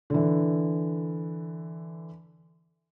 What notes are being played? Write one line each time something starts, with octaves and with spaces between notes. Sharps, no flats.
D3 E3